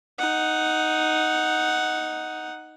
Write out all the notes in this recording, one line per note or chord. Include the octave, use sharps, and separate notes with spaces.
D#4 F#5